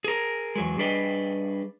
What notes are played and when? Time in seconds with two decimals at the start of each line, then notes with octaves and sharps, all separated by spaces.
0.04 G#4 A#4
0.55 E2 F#3 G#3
0.78 G3 D4 G#4 B4 D5 D#5